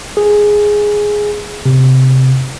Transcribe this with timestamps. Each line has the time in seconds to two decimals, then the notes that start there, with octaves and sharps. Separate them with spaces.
0.17 G#4
1.65 C3